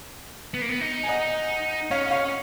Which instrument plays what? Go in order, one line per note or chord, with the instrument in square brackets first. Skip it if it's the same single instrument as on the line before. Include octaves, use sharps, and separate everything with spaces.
[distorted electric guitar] B3
A#3
B3
D#4
[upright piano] G#5
D#5 F#5
[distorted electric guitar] C#4 [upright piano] C#5 F5
[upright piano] C#5 F5